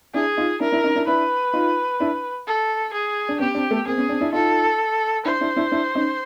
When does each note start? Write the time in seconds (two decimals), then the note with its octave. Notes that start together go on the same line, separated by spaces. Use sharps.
0.14 D4 E4 G#4
0.37 D#4 F4
0.60 D4 E4 A#4
0.72 D4 E4
0.84 C#4 D#4
0.96 D4 E4
1.07 D4 E4 B4
1.54 D#4 F4
2.00 D4 E4
2.47 A4
2.93 G#4
3.29 D4
3.40 B3 C#4 G4
3.55 C4 D4
3.71 A3 B3
3.86 A#3 C4 G#4
3.98 B3 C#4
4.09 C4 D4
4.21 D4 E4
4.32 D#4 F4 A4
5.25 D4 E4 C5
5.41 D4 E4
5.57 D4 E4
5.72 D4 E4
5.95 C#4 D#4